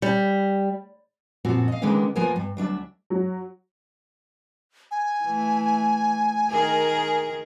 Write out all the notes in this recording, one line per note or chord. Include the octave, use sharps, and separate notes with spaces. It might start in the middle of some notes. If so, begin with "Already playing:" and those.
G3
F#2 A#2 F3 C4 F#4
D#5 F5
D3 D#3 G#3 A#3 B3 C#4
D2 F3 A#3 B3 A#4 G#5
G2
D2 F#3 D4 E5
F#3
G#5
E3 A3
D#3 G#4 A#4